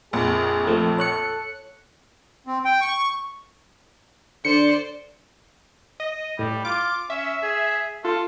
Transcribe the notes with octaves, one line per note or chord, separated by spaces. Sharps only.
A#1 F2 G#4
F3 A3 A4
C#5 F#6 C#7
C4
G5
C#6
D3 C5 D5 C#7
D#5
A2 G3
F4 D6
C#4 E5
G#4
F4 A4